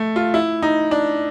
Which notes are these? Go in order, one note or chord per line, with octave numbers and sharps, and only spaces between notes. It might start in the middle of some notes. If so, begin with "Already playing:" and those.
Already playing: A3
F4
E4
D#4
D4